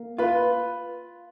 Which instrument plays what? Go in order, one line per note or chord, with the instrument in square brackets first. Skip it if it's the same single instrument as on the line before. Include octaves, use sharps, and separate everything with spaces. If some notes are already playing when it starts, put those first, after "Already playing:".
Already playing: [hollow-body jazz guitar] A#3
[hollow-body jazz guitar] F4 [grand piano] B4